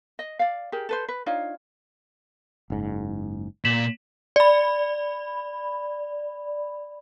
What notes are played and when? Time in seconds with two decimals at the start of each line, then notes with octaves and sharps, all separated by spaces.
0.19 D#5
0.39 D5 F5
0.72 G4 G#4 A#4
0.89 A4 B4 C5
1.08 B4
1.26 D4 D#4 F4 C#5
2.70 F#1 G#2
3.65 A#2 B6 E7 F#7
4.36 D5 B5